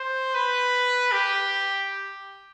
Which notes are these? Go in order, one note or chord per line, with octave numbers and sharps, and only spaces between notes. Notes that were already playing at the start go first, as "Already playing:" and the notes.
Already playing: C5
B4
G4